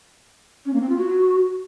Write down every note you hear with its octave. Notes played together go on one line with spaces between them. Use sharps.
C#4
A#3
C4
F4
F#4